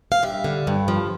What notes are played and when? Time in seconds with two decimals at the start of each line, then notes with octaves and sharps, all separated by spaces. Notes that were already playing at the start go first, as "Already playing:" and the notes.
0.12 F5
0.23 G2 E5
0.44 D3
0.67 G2
0.88 F3